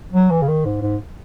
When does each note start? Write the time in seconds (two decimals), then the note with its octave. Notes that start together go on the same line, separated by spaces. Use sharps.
0.13 F#3
0.31 E3
0.42 C#3
0.48 D#3
0.65 G#2
0.82 G#2